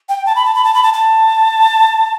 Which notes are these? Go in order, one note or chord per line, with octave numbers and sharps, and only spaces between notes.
G5
A5
B5
A5
B5
A5
B5
A5
A5